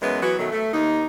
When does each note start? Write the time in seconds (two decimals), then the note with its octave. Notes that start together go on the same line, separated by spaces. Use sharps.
0.02 F#2 E3 F#3 G#3 B3
0.22 E3 F#3 B3 F#4
0.39 B2 D#3 F#3 A3
0.52 A3
0.74 D#2 A#3 D#4